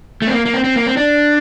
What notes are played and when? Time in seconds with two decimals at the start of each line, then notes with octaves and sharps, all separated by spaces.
0.22 A3
0.27 C4
0.32 A#3
0.46 A#3
0.54 C4
0.64 C4
0.76 A#3
0.86 C4
0.97 D4